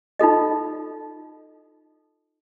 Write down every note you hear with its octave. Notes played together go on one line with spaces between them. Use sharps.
D#4 F4 A4 D#5